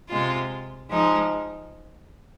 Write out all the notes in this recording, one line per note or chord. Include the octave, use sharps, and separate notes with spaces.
C3 G#3 F4
F3 G#3 D#4